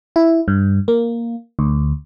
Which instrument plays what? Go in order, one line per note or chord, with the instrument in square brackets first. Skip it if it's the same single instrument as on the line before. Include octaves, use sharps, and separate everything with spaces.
[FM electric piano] E4
G2
A#3
D2